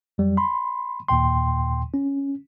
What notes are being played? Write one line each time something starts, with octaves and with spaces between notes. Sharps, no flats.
F2 F#3 G3
B5 C6
D#2 A#2 G5 C6
C#4